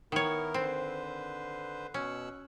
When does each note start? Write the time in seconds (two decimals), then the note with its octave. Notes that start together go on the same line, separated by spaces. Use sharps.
0.12 D#3 B3 E4 A#4 C#5
0.54 D3 C4 B4 C5
1.94 B2 C#4 E6 F#6